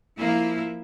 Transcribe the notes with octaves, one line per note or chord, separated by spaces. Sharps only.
F3 A#3 E4